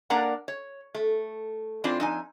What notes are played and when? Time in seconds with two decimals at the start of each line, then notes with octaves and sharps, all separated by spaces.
0.10 A#3 D4 A#4 D5 F#5 A#5
0.48 C#5
0.95 A3
1.84 E3 C4 D4 F4
2.00 F2 D#4 G#5